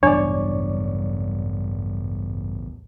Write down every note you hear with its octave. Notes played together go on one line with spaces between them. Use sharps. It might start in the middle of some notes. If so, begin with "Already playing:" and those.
A1 E2 G2 E3 F#3 D4 C#5 D5